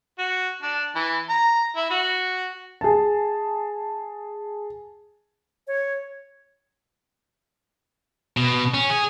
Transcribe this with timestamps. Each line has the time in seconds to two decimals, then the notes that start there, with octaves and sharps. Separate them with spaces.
0.18 F#4
0.62 D4
0.95 E3
1.29 A#5
1.76 E4
1.90 F#4
2.81 G#4 A5
5.67 C#5
8.37 B2
8.74 C#4
8.90 G#4